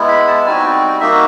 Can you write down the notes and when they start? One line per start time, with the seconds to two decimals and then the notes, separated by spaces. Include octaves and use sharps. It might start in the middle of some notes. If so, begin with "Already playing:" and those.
Already playing: G#3 B3 E4
0.08 B5
0.27 A5
0.45 G3 C4 D#4 F#4 G#5
0.64 G5
1.00 A#3 D#4 F#4 E5